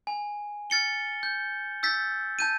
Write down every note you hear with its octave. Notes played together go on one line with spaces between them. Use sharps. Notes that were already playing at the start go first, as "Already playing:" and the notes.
G#5
F6 A6 C#7 G7
G6
E6 G6 A6 B6
A5 G6 D#7